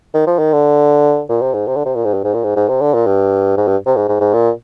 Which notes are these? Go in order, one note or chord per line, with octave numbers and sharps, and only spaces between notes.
D#3
F3
D#3
D3
A#2
C3
G#2
C3
D3
C3
A#2
G#2
G2
G#2
A#2
G#2
G#2
C3
D3
A#2
G2
G#2
G2
C3
G#2
G#2
G#2
A#2